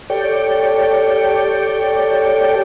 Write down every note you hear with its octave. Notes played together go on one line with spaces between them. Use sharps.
G4 A4 C#5 D5 G5